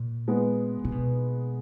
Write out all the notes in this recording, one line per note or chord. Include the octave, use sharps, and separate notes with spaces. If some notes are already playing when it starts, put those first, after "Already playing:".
Already playing: A#2
G#3 B3
A#2
B2